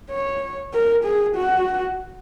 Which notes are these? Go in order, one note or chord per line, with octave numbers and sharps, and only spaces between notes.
C#5
A#4
G#4
F#4